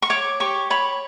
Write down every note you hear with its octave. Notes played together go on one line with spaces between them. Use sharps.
C#6
C#5 D6
G4 C#6
C#5 B5